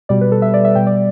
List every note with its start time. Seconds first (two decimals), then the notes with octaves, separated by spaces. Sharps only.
0.09 B2 G3 D5
0.21 B4
0.32 A4
0.42 E5
0.54 D5
0.65 E5
0.75 B2 G3 G5
0.87 D5